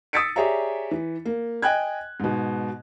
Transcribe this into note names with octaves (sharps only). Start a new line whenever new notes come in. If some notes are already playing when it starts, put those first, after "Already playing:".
D#6 E6 A6 B6 C#7 D7
G4 G#4 C#5 D5 E5 A#5
E3
A#3
D#5 G5 G#5 F#6 G#6
G#2 B2